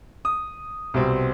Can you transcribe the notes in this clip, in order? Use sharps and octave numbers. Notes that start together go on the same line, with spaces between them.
D#6
C2 B2 G3 C4